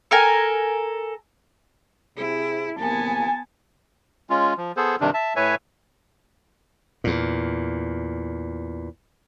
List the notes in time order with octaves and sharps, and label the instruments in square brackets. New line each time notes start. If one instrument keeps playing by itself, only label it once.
[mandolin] A4 A#4 G#5
[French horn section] C3 G#4 [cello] E4
[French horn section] A2 C3 A#3 [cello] B3 [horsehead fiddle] G#5 A5
[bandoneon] G#3 C#4 F4
F3
B3 G#4 A4 C5
G2 C3 D#3 D4
E5 A5
A2 B4 C#5 E5 G#5
[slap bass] E2 A#2